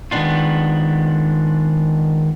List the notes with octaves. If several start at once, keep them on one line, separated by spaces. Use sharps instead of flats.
D#3 G#3 B3 D4 F4